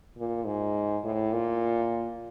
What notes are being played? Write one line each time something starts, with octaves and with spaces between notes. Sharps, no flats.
A#2
G#2
A2
A#2